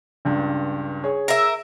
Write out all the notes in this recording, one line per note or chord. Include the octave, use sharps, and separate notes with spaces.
C#2 G2
G#4 C#5
A#4 E5